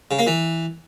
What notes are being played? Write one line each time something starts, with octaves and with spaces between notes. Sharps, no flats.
C#3
A#3
E3